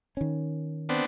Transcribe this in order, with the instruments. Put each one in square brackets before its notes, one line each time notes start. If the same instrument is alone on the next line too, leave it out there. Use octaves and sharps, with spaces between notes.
[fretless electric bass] D#3 C#4
[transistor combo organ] B3 C4 D4